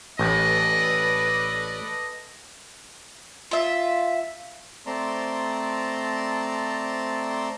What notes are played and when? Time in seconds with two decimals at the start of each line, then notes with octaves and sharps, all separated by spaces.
0.19 A1 A4 B4 D5 D#5
3.51 F4 E5
4.87 A3 C4 D5 A5 A#5 C6